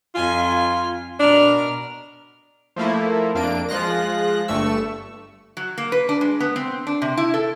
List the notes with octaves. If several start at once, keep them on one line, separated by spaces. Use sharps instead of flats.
F2 F4 G#5
B2 D4 A#4 F6
F3 A3 A#3 E4
F2 A#3 D4 D7
F3 G#3 F4 F#6 A#6
G1 G2 A3 C#6 E6
F#3
A#3
B4
D4
G#3
B3
C4
D4
C3
E4
A4